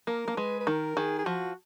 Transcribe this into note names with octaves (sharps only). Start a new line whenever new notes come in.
A#3 A#4
A#3
G#3 B4
B4
D#3 A#4
D#3 G#4
G#4
F3 F#4